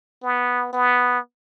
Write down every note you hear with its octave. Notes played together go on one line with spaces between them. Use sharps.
B3
B3